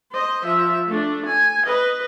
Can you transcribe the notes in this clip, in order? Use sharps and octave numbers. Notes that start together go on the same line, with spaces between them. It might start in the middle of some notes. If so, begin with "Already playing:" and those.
C5 D#5
F3 E5
A3 D4
G#5
B4 D#5